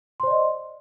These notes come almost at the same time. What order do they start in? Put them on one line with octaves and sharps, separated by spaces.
C6 C5 D5 D#5